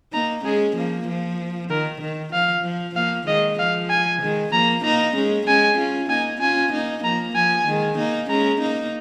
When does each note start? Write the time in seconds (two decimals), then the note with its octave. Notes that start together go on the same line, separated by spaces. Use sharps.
0.13 A#3 D#4 A#5
0.44 G#3 C#4 G#4
0.76 F3 A#3
1.08 F3
1.70 D#3 A#4
2.01 D#3
2.33 F3 F5
2.64 F3
2.95 F3 A#3 F5
3.27 D#3 G#3 D#5
3.59 F3 F5
3.90 G#5
4.22 D#3 G#3
4.52 F3 A#3 A#5
4.84 A#3 D#4 A#5
5.15 G#3 C#4
5.47 G#3 C#4 G#5
5.78 C#4 F4
6.10 A#3 D#4 G#5
6.41 C#4 F4 G#5
6.73 A#3 D#4
7.04 F3 A#3 A#5
7.36 F3 G#5
7.67 D#3 G#3
7.98 A#3 D#4
8.30 G#3 C#4 A#5
8.61 A#3 D#4